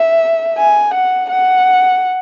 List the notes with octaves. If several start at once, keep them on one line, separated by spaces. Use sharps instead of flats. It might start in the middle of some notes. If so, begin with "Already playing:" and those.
Already playing: E5
G#5
F#5
F#5